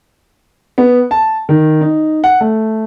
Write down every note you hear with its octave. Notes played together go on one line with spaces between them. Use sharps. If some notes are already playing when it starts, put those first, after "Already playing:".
B3
A5
D#3
D#4
F#5
A3